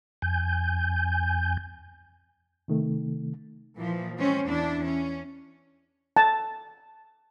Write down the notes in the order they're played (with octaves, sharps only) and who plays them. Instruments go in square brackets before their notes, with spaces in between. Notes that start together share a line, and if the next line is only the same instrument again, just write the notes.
[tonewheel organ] F2 G#5 G6
[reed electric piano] C3 D#3 A3
[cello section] A#2 E3 F3
G#3 C4 C#4
E2 D4 E4
C#4
[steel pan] A5